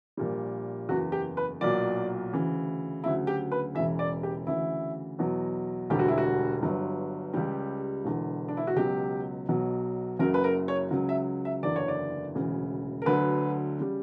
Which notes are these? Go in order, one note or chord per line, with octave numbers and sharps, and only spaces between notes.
A#1 A#2 G3
F#1 E2 C#3 F#4
G4
B4
B1 A#2 F#3 D5
D2 C#3 E3
D2 C#3 F#3 E4
G4
B4
E1 E2 C#3 E3 E5
D5
G4
D2 C#3 E3 E4
E2 B2 F#3
E1 D2 D3 G3 G4
F#4
E4
F#4
G1 G2 F#3
C#2 C#3 G3 G4
E1 E2 D3
D4
E4
F#4
C#2 B2 F#3 G4
B1 B2 F#3
F#1 F#2 C#3 F#3 A#4
B4
A#4
C#5
C#2 C#3 F#3
E5
E5
F#1 E2 D3 D5
C#5
D5
E1 D2 C#3 E3
A#4
D2 D3 F#3 B4
C#3 G3